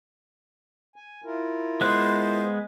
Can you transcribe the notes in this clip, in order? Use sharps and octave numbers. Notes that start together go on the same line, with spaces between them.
G#5
E4 F4 A#4
G#3 B3 C5 F#6